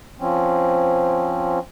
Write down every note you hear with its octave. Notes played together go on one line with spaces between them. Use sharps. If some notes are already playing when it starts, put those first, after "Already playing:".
F3 C4 C#4